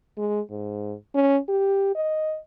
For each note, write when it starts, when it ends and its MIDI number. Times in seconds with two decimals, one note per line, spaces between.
0.18 0.40 56
0.50 0.94 44
1.14 1.38 61
1.48 1.95 67
1.95 2.38 75